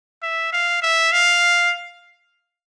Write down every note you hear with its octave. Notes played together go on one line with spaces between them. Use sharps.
E5
F5
E5
F5